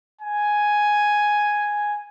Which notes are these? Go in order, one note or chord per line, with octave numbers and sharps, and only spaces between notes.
G#5